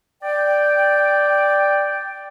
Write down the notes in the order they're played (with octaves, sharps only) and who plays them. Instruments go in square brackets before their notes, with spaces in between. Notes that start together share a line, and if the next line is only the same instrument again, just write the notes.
[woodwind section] D5 G5